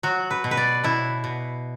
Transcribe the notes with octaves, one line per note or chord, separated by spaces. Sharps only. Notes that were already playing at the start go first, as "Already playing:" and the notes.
F#3 F#4
B4
B2
B4
D5
B2 E4
B2